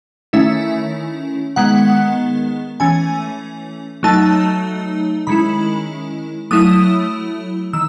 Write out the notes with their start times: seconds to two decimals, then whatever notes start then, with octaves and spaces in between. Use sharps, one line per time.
0.33 D#3 A3 C#4 E4 E5
1.56 D#3 G#3 B3 F#5
2.80 E3 A3 C#4 G#5
4.03 F#3 A3 D#4 A5
5.27 D#3 G#3 C#4 E4 B5
6.51 F#3 A3 E4 D#6
7.73 D#3 E6